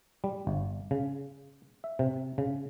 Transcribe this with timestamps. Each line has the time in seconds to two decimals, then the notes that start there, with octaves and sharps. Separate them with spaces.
0.24 G3
0.47 G1
0.91 C#3
1.84 E5
1.99 C3
2.38 C#3